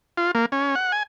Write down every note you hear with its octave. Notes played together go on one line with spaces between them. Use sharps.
F4
A#3
C#4
F#5
G#5